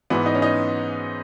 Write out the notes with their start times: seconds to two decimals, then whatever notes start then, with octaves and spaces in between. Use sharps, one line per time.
0.10 G#2 E3 B3
0.26 D#4
0.35 C#4
0.42 D#4